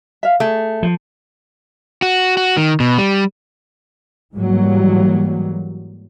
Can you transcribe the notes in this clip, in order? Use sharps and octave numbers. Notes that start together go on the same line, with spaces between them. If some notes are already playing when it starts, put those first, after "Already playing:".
E5 F5
A3 G#4
F3
F#4
F#4
D#3
B2
G3
G#2 E3 F#3 G3 A#3